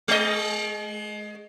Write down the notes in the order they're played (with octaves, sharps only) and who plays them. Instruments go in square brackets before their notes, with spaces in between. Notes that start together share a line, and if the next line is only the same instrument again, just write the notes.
[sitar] G#3 D#5